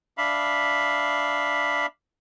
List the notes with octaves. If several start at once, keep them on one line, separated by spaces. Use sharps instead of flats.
D4 E5 F5 B5